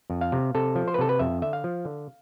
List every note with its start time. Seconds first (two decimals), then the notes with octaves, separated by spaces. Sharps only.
0.10 F2
0.21 F5
0.32 C3
0.55 C3 A4
0.75 F3
0.88 C5
0.94 B4
0.99 C3 A4
1.09 B4
1.19 F2 E5
1.42 D3 E5
1.53 F5
1.64 F3
1.85 D3